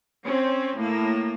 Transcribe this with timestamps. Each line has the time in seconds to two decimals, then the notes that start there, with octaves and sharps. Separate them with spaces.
0.25 C4 C#4
0.80 A2 A#3